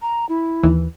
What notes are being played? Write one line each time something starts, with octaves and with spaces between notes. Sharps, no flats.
A#5
E4
D#2 E3